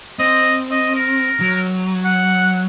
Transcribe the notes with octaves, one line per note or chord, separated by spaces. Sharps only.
C4 D#5
D#5
A#4
F#3
F#5